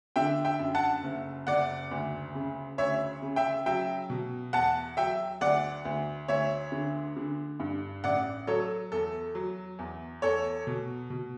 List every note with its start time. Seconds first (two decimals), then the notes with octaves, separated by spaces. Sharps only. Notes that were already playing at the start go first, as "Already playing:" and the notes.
0.16 D3 E5 G5
0.45 E5 G5
0.59 F#2
0.75 F#5 A5
1.04 F#1
1.47 F#1 D5 F#5
1.91 D2
2.35 C#3
2.78 D2 C#5 E5
3.22 C#3
3.36 E5 G5
3.66 F#3 E5 G5
4.10 B2
4.53 E2 F#5 A5
4.97 F#3 E5 G5
5.41 D2 D5 F#5
5.85 D2
6.28 D2 C#5 E5
6.72 D3
7.17 D3
7.60 G2
8.04 A1 D5 F#5
8.47 F#3 A4 C#5
8.92 E2 A4
9.35 F#3
9.79 E2
10.22 E2 A4 C#5
10.67 B2
11.10 B2